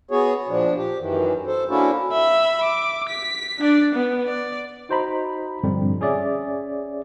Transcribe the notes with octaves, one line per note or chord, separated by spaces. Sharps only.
B3 F#4 G#4 C#5
A#2 F3 D4
G4
F#2 D#3 E3
A4 C5
A#3 C#4 D4 E4 F#4 A4
E5 B5
D6
B6
D4 D5
B3
D5
D#4 F#4 C5 D#5 A#5 B5
G2 A#2 D3 F3 G3 C4
C#4 G#4 C#5 D5 E5